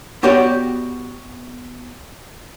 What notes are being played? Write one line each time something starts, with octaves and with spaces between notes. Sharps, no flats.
B3 F#4 G4 C#5 D5 G5